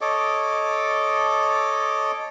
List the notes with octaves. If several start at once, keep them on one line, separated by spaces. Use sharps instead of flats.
A4 C#5 D#5 D6